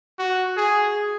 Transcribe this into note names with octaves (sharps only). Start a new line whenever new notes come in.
F#4
G#4